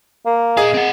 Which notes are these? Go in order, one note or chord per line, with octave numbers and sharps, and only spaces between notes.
A#3
A#2 G#4 D#5 F5
C4 F#5